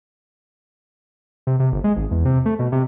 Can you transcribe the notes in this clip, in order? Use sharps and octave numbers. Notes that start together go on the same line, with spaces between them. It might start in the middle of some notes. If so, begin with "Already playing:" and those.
C3
C3
G1
G#3
G#1
E2
C3
A3
B2
C3